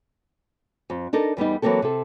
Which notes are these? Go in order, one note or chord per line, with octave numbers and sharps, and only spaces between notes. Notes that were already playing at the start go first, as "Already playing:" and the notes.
F2
D4 D#4 A4 A#4
E2 G3 B3 D#4
E3 F#3 G3 A#3 C4 A4
C3 A4